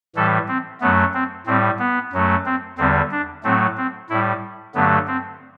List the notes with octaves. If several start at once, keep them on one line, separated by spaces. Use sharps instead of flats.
A2 E3 G3 A4
C4
F#2 F#3 A3 B3
C4
A2 G3 C4
B3
F#2 F#3 A3
C4
E2 D3 G3 C4
D4
A2 F#3 A3 C4
C4
A2 G3 E4
G2 D3 F#3 A3 B3
C4